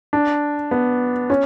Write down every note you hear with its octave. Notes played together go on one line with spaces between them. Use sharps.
D4
B3
C#4